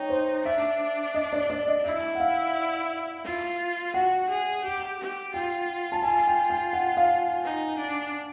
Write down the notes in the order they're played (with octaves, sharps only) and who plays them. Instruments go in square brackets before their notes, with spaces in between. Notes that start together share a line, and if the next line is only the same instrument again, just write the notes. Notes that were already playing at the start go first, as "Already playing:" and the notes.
Already playing: [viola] D#4 [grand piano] C#5 G5
[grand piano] C5
[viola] D4 [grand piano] E5
[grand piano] D#5
D5
D5
D#5
[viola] E4 [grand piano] E5
[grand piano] F#5
F5
[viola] F4
[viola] F#4 [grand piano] F#5
[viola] G#4
G4
G4
[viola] F4 [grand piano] G5
[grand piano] A5
[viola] F4 [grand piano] G#5
[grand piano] G5
G5
F#5
F5
[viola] D#4
D4